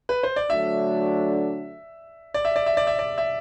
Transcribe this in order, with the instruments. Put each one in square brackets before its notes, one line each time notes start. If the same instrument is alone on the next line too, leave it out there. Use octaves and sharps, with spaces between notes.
[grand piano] B4
C5
D5
[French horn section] D3 F#3 A3 D4 F#4 [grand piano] E5
[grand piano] D5
E5
D5
E5
D5
E5
D5
E5